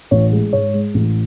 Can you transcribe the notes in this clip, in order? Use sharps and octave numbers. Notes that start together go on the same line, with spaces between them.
A1 C#5
G#3
G#2 C#5
G#3
A1